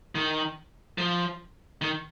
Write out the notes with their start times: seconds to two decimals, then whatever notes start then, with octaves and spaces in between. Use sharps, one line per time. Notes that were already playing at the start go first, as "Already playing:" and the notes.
0.15 D#3
0.98 F3
1.82 D#3